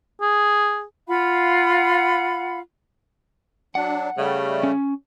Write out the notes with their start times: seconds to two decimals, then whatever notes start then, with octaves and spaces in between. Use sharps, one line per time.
0.21 G#4
1.08 F4 F5 F#5 B5
3.75 F#3 D4 F#5
4.18 C#3 G3 A3
4.63 C#4